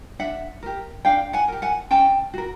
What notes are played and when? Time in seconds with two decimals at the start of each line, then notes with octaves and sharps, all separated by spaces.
0.19 D4 E5 F#5
0.63 G4 A#4
1.05 D4 F5 G5
1.33 F#5 G#5
1.48 G4 A#4
1.62 F#5 G#5
1.91 C#4 G5 A5
2.34 F#4 A#4